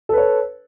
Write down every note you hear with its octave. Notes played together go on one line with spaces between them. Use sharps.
A4 B4 C#5